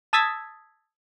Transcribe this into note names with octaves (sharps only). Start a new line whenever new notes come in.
A5 D#6 E6 G#6 A6 B6